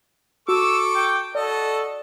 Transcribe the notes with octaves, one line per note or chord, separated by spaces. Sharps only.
F#4 A4 C#6 D6 E6
G5
F#4 A4 D5 D#5